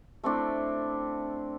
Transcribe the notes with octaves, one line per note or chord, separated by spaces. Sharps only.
A3 C4 D4 E4